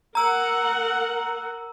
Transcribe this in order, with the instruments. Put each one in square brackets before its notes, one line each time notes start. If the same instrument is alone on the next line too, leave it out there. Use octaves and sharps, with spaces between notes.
[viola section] A#4 F#5 [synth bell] A#5 E6